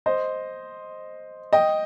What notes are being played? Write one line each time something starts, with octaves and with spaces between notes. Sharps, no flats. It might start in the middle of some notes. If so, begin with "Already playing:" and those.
C5 D#5
D#5 G5